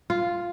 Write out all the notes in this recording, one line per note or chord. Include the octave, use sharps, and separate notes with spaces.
F4